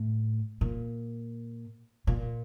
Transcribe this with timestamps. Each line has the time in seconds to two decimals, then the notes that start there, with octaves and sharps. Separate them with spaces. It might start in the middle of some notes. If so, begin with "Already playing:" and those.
Already playing: A2
0.61 A#2
2.07 A#2